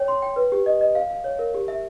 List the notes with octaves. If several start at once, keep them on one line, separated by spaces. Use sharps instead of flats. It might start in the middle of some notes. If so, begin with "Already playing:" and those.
Already playing: C#5 G5
C6
G5
B4
G4
D#5
D#5
F5
F5
C#5
A#4
G4
E5